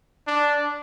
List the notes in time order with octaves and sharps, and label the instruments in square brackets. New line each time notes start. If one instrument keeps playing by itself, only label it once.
[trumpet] D4